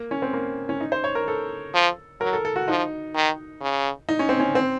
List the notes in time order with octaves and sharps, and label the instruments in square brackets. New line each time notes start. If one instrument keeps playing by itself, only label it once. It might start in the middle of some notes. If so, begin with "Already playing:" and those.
Already playing: [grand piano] A#3
C#4
C4
A#3
C#4
D#4
C5
C#5
A#4
A4
[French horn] F3
[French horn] F#3 [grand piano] A#4
[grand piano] A4
A4
F#4
[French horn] F3 [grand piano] D#4
[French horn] D#3
C#3
[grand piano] D#4
C#4
C4
C#4
C4